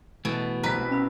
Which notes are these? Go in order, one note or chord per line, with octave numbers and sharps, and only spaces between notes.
B2 E3 A3
C2 B4 C5 A#5 B6
C#4 B5 E6